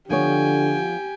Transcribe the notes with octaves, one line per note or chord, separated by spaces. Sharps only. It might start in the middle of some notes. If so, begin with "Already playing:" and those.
D3 F3 B3 G4 C#5 G5 G#5